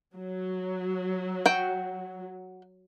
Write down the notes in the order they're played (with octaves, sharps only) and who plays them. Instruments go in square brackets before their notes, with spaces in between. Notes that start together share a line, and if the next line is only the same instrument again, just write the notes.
[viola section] F#3
[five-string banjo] F#4 G5